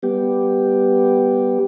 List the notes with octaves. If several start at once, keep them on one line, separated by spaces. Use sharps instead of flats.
G3 B3 G4